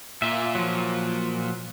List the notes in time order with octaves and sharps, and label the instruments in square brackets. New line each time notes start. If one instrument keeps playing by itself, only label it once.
[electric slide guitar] A#2 F4 [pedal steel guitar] E5
[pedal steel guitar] F3 F#3